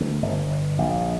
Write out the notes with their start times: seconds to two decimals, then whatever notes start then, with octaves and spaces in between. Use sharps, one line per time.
0.01 D2
0.22 G1
0.78 A#1